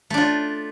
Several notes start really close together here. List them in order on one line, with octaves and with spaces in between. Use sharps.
A3 D4 F4